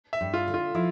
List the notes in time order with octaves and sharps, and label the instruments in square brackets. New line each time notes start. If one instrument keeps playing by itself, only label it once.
[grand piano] E5
[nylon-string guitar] G2
[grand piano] F4
[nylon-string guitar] D3
[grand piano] F4
[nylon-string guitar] F3 [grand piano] E4